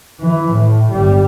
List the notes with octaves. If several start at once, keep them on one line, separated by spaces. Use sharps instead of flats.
E3
A2
G1 G3